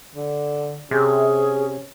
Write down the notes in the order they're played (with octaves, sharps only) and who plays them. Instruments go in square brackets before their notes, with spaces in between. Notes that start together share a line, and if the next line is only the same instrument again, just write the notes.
[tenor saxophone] D3
[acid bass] C3 [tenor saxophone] C#4 [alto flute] G#4